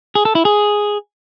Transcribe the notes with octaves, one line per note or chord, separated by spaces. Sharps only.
G#4
A4
E4
G#4